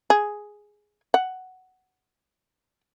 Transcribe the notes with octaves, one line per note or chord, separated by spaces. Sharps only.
G#4
F#5